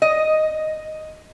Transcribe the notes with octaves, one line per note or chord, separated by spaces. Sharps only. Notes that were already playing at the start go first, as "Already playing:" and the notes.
D#5